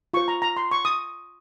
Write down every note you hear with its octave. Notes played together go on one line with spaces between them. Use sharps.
F4 C5 C#6
A#5
A#5
C6
C#6
D#6